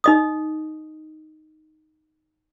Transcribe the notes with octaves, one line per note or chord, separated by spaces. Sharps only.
D#4 D#5 D#6